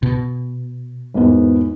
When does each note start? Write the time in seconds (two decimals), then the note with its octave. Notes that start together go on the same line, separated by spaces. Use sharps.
0.03 B2
1.14 G#1 E2 B3